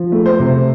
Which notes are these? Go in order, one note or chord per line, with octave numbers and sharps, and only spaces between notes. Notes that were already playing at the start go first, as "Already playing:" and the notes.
Already playing: F3
A3
C5
C3